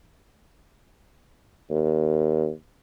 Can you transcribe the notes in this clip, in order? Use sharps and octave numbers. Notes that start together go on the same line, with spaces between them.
D#2